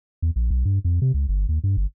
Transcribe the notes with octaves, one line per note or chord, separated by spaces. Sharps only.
E2
A#1
B1
G2
F2
C3
C#2
G1
D#2
G2
G1